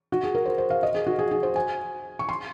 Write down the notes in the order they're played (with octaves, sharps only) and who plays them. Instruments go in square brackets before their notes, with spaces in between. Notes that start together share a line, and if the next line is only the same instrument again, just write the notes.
[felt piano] F#4
G#4
A#4
C5
C5
F5
D#5
G#4
F#4
G#4
G#4
C5
G#5
C#6
C6